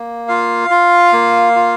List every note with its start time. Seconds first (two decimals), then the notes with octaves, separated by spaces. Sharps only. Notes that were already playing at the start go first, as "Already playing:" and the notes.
Already playing: A#3
0.28 F4 F5
0.70 F4
1.13 A#3
1.56 F4